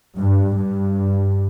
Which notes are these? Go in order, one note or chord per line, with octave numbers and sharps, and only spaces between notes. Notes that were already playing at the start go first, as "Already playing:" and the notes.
G2
G2